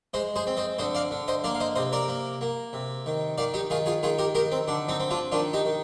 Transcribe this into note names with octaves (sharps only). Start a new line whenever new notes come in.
G#3 C5 D#5
G#4 C5
C4
C5 D#5
D3 C5 D#5
D5 F5
D3
C5 D#5
A#3 D5 F5
F5
C5 D#5
C3 C5 D#5
A#4 D5
A#3
A#3
C3
D#3
D#3 D5 F5
D#4 G4
D#3 F4 G#4
F4 G#4
D#3 F4 G#4
G4 A#4
D#3 G4 A#4
C4
D3 D4
C4 D#4
C4
D4 F4
D#3 D4 F4
D#4 G4
D#3